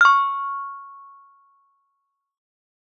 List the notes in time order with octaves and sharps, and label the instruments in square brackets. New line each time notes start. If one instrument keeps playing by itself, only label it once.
[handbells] C#6 F6